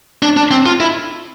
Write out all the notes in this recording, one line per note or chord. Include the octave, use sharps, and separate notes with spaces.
D4
D4
C4
F4
E4